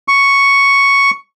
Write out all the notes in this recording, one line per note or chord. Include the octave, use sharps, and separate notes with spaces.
C#6